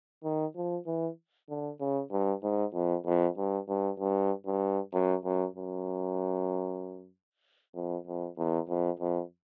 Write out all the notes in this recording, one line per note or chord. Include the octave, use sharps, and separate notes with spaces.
D#3
F3
E3
D3
C#3
G2
G#2
F2
F2
G2
G2
G2
G2
F#2
F#2
F#2
F2
F2
E2
F2
F2